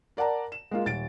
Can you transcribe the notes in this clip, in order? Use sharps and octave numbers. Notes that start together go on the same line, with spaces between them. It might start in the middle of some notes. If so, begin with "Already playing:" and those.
A#4 D5 F#5 A5 A#5
E7
G#3 A#3 F4
D#1 A6 D7